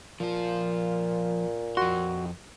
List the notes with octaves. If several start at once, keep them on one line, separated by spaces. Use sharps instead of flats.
A#2 F3 F4
F2 F#4 C6